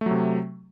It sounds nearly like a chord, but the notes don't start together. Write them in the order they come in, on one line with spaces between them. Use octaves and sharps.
A3 F#3 C3